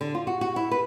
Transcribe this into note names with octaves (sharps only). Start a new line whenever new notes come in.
D3
F4
F#4
F#4
E4
B4